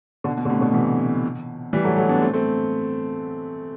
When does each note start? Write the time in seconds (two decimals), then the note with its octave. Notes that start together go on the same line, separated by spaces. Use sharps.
0.24 B2 D3
0.37 B2
0.45 D3
0.49 A2 C3
0.61 B2 D3
0.73 C3 E3
1.73 E3 G3
1.84 F#3 A3
1.96 F#3 A3
2.09 B3 D4
2.21 A3 C4
2.33 A3 C4